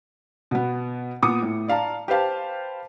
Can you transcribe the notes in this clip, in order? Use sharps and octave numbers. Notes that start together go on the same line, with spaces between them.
B2 B3
A#2 B3 D6 D#6 C#7
A2
D5 F5 A5 A#5
G4 B4 C5 F5 A5